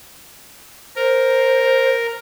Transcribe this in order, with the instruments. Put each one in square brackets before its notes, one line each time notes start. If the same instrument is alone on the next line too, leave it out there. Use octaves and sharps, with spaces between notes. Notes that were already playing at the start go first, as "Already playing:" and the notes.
[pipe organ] A#4 [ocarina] C5